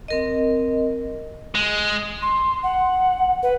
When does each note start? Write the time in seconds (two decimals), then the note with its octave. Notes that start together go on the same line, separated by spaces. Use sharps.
0.08 C4 A#4 D#5
1.55 G#3
2.22 C6
2.63 F#5
3.43 B4